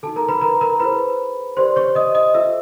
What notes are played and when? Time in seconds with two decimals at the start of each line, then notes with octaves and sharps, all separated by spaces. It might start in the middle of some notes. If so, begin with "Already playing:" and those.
0.03 D#4 F#4 A4 A5
0.16 A#4 A#5
0.29 B4 B5
0.41 A#4 A#5
0.61 A#4 A#5
0.80 E4 G#4 B4 C5 B5
1.57 G4 A#4 C5 D5 C6
1.76 C#5 C#6
1.95 D#5 D#6
2.15 D#5 D#6
2.34 F4 A4 C5 E5 E6